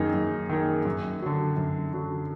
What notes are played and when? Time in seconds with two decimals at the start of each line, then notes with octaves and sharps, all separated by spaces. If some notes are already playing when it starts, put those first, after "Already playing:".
Already playing: F#2 D#3 A#3 D#4 G#4
0.14 F#2
0.50 D#3 A#3 D#4 G#4
0.85 F#2
1.22 D3 F#3
1.57 F#2
1.93 D3 F#3